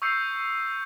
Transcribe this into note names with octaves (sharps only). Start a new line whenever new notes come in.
C#6 D#6 E6 G6 C7 C#7